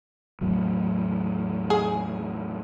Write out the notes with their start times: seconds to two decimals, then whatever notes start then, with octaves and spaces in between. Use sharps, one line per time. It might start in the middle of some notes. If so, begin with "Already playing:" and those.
0.41 E2 A2 F#3
1.70 G#4